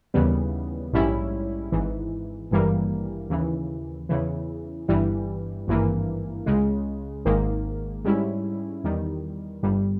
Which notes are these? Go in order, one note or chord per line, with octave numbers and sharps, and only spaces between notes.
D#2 C#3 E3 G3 B3
A#1 G#2 G3 C#4 E4
G#1 G#2 E3
G#1 G2 E3 G3 A#3
D#2 C#3 E3
E2 C#3 E3
G1 G2 E3 G3
G#1 G2 E3 A#3
C#2 C#3 G#3
G#1 G#2 D#3 A#3
G#2 G3 C#4 E4
E2 D#3 G3
G1 G2 G3